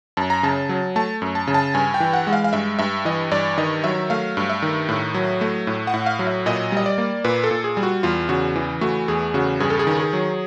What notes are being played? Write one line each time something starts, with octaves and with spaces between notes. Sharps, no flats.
F#2 A5
A#5
C#3 A5
F#3
A3 A5
F#2
A5
C#3
A5
G2 G#5
G5
E3
F#5
G#3
F5
F5
G2 E5
G2 E5
E3 D#5
G2 D5
D#3 D#5
F#3 E5
A3 F5
G2
E5
D#3
A2
F#3
A3
A2
F#5
A2
F5
F#3
E5
A#2 D#5
G3 D#5
D5
A#3
A#2 B4
A4
A#2
G#4
G3
F#4
E2 F4
C#3 F#4
E3
A3 F#4
E2 G#4
C#3 F#4
G2 G#4
A4
G#4
D#3
G#4
F#3